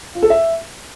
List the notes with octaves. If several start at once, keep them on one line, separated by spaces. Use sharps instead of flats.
F4
A4
E5